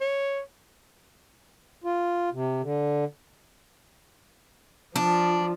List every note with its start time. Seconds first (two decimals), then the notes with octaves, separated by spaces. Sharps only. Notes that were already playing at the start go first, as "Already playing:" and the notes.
0.01 C#5
1.84 F4
2.32 C3
2.62 D3
4.96 F3 D4